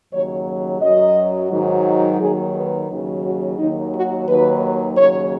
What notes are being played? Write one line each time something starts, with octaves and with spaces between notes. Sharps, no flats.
D#2 C#3 F#3 C#5
F#2 F#3 D#5
G#2 D#3 F#3
D#2 D#3 F#3 G#4
B4
D#2 C#3 F#3
F#4
D#2 D#3 F#3 D#4
F#4
D#2 D#3 F#3 B4
D#2 C#3 F#3 C#5